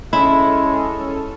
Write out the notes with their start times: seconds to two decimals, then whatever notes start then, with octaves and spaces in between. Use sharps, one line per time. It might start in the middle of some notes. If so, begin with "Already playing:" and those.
0.13 G#3 C#4 E4 A4